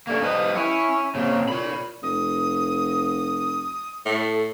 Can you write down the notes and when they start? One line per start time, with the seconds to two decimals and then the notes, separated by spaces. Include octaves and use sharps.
0.07 G2 A3 A#3 C#4
0.22 F3 G3 B4 D#5
0.56 E4 C#5 G#5
1.15 A#2 C#3 C4
1.48 E2 A#2 C#5 B5
2.03 F1 D#6
4.06 A2 A4